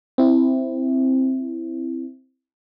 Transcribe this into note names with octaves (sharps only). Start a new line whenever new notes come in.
C4 E4